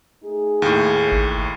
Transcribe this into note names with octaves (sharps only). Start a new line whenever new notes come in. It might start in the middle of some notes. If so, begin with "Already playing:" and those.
A3 D#4 G#4
D#2 A2
A1